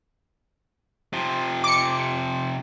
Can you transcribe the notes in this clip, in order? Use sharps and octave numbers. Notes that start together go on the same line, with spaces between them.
C3 F3
D6 C#7